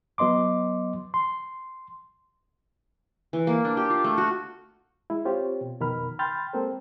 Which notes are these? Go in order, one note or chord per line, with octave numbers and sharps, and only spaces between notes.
F#3 B3 D#5 C6 D6
C6
E3
A#3
D4
G4
F4
A3
F#4
G#3 E4
C4 F4 G4 C5 C#5
B2
F2 B2 D#3 A#4 B5 F6
G5 B5 C6 F6 G6 A6
G#3 A#3 C4 A4 A#4 C5